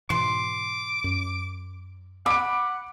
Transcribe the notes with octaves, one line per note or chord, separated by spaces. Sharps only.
G#2 B2 E3 C6 D6
F#2
F#5 B5 D6 D7